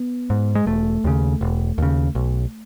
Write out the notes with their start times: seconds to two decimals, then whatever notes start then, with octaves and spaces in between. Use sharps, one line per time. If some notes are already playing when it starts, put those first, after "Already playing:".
Already playing: B3
0.30 G#2
0.55 G#3
0.66 E1 A3
1.04 D#2 C#3
1.41 E1
1.78 D#2 C#3
2.15 B1